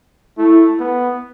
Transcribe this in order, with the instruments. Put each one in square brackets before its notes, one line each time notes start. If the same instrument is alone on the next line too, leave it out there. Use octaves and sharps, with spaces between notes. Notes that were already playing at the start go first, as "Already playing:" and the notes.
[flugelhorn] A3 [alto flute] E4
[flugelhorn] B3